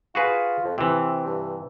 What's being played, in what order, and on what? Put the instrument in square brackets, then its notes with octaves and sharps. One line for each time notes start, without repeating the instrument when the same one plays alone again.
[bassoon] F4 [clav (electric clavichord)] F#4 G#4 B4
[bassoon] F2
[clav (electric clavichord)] C3 E3 [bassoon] C4
[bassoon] G2